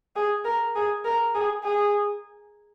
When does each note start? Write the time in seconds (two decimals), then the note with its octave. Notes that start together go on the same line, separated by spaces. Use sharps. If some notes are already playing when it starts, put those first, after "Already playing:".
0.16 G#4
0.45 A#4
0.75 G#4
1.05 A#4
1.35 G#4
1.64 G#4